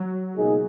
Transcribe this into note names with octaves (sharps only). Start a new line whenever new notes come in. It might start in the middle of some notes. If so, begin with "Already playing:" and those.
Already playing: F#3
C#2 B2 A#3 D#4 G#4